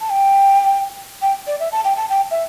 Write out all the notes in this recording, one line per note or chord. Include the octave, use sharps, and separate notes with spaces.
A5
G5
G5
D5
E5
A5
G5
A5
G5
E5